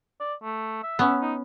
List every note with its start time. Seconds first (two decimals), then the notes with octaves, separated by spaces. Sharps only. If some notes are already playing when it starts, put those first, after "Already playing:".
0.20 D5
0.43 A3
0.83 E5
0.99 B3 C#4
1.21 D#4